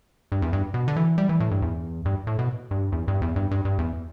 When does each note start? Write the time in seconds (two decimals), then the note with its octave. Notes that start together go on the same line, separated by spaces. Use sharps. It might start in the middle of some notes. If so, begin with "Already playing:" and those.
0.32 G2
0.42 E2
0.53 G2
0.74 B2
0.88 D3
0.96 E3
1.18 G3
1.29 E3
1.40 A2
1.51 G2
1.62 E2
2.05 G2
2.27 A2
2.39 B2
2.71 G2
2.92 E2
3.08 G2
3.22 E2
3.36 G2
3.51 G2
3.65 G2
3.79 E2